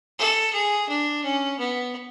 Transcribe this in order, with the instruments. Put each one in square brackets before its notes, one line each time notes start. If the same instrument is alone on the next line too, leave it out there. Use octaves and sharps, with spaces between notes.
[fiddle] A4
G#4
D4
C#4
B3